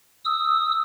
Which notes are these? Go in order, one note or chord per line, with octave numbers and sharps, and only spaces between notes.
D#6 E6